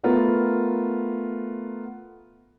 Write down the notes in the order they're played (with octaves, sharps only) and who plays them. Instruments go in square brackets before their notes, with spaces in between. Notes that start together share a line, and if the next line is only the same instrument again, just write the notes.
[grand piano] A3 B3 F4 A#4